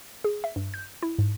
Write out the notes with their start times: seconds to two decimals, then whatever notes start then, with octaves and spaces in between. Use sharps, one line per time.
0.24 G#4
0.44 E5
0.56 G2
0.74 G6
1.03 E4
1.18 G#2